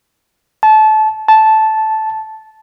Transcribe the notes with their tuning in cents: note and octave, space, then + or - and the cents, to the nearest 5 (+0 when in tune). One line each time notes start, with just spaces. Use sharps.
A5 -25
A5 -10